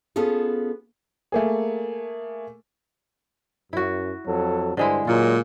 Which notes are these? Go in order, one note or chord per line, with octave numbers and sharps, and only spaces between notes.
B3 C#4 F4 G#4 A4
A3 A#3 G#4
F#2 E4 F#4
F2 F#3 A4
G2 D3 G#3 E4 C5
A#2 F#3 G#3 F4 A#4